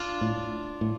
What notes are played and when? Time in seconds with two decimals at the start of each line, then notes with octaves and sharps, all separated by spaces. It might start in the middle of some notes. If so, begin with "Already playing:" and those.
Already playing: D4 F4
0.21 A2
0.81 A2